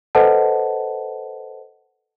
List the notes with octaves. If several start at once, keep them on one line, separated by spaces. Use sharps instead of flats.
A4 B4 C5 D#5 F#5 A5